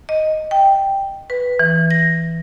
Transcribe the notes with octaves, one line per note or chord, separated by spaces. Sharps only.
D#5
G5
B4
E3
A#6